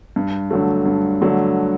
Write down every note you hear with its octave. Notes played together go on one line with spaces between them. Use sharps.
G2
D3 F#3 A3
G2
D3 F#3 A3